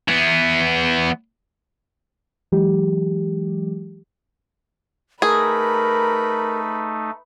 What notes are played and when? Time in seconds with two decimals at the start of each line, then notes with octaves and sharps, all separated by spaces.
0.08 E3 B3
2.52 E3 F#3 G#3 G4
5.22 A3 D#4 G#4 A#4 B4